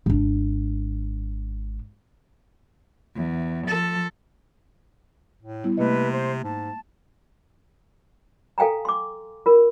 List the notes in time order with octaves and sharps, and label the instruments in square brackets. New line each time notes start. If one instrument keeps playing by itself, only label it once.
[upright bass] G#1 D4
[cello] E2
F3 A4
[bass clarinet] A2
[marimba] G3 B3 E4
[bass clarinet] C3 [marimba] A3 A#3 D#5 [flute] B4
[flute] C5
[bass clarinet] G#2 [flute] A5
[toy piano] A4 F5 G5 G#5 A#5
C6 D6
F4 A#4